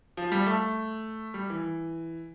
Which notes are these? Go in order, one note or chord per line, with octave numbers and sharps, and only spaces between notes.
F3
G3
A3
G3
E3